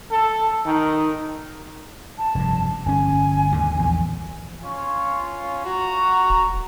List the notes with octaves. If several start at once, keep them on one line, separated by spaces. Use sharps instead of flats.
A4
D#3
A5
F1 G2
G1 C#4 G#5
D#2 G#2 D3
A#1 E2 A#2
C#4 F4 C#5
F#4 A#5
D#1